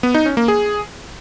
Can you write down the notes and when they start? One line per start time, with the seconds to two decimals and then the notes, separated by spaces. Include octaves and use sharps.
0.03 B3
0.14 D#4
0.26 C#4
0.37 A#3
0.48 G#4